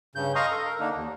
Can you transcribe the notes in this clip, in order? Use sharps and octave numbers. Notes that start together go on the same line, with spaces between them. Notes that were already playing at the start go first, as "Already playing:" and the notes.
G2 C#3 G6
D#5 F5 A#5 C6 C#6 D#6
A4
A#4
D3 A#3 D4 D#4
D#2